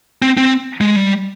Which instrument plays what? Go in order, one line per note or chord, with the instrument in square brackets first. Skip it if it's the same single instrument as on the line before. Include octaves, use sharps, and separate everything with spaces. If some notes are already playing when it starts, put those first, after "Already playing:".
[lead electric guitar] C4
C4
G#3
G3